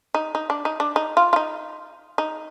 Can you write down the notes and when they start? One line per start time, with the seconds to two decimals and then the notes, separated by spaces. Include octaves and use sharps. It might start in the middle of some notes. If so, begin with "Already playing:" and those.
0.14 D#4
0.35 D#4
0.50 D4
0.65 D#4
0.80 D4
0.96 D#4
1.17 F4
1.33 F4
1.36 D#4
2.18 D#4